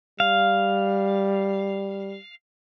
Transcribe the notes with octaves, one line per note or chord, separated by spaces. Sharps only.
G3 F5